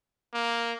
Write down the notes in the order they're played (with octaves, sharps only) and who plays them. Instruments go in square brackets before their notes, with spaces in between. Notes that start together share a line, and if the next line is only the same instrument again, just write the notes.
[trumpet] A#3